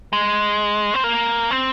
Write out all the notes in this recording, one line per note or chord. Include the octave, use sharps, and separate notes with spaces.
G#3
C4
A#3
C4